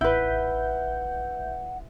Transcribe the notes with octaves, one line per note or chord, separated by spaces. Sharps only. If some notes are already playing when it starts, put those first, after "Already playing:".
A1 E4 B4 E5 F#5 G6